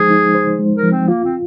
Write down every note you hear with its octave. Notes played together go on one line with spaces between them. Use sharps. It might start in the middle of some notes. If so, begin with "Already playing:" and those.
Already playing: F3 G#3 D#4 G#4 C5
D#4
C5
G#3
A#4
F3
C4
A#3 F4
C4